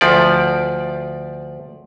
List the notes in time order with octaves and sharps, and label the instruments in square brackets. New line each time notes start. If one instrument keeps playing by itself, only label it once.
[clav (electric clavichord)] D2 F3 D5